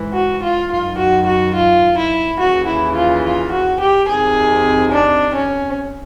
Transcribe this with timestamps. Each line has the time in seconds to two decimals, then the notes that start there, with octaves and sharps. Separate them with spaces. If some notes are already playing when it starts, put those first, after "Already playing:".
Already playing: G#2 E3
0.15 F#4
0.43 F4
0.71 F#2 D#3 F4
0.98 F#4
1.27 F#4
1.55 F4
1.98 E4
2.39 D#2 C#3 E3 F#4
2.68 E4
2.96 F4
3.24 F4
3.52 F#4
3.80 G4
4.08 F2 C3 D#3 G#4
4.92 D4
5.35 C#4